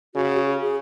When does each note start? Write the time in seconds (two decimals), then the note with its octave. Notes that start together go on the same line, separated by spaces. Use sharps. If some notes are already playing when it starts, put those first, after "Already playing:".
0.15 C#3 F#4
0.38 G#4
0.61 G#4